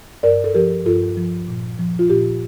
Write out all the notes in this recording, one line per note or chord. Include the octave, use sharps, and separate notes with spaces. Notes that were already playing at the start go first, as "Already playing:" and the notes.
G2 A#4 D5
A4
F3 G4 A#4
G2 F4 A4
F3
A#2
F3
F4
A#2 G4